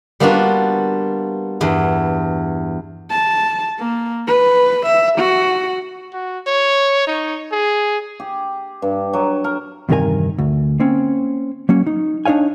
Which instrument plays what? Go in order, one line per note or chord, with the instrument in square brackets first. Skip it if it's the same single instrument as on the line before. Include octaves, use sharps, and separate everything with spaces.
[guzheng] G3 A#3 B3 D4 F4 F#4
E2 G2
[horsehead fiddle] A5
A#3
B4
E5
F#4
[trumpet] F#4
C#5
D#4
G#4
[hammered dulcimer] G4
G2
F#3
A#4
[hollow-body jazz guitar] E2 G2 C3 D#3 A#4 G#5
D2
A#3 C4 C#4
F#3 A#3 C#4
D#4
D4 D#4 C#5 F5 G#5